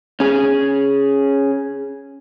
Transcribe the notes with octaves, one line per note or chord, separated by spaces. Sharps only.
C#4 G#4